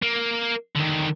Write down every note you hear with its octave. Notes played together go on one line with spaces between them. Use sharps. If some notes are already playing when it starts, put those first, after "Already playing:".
A#3
D3 D#3